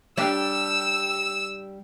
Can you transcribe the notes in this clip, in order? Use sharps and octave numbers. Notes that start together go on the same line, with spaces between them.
G3 D4 G4 E6